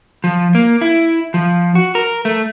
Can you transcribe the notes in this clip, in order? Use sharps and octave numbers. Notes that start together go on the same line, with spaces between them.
F3
A#3
E4
F3
F#4
A#4
A3